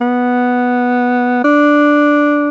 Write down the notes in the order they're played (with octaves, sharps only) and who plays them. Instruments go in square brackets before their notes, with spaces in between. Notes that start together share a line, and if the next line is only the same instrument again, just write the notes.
[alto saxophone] B3
D4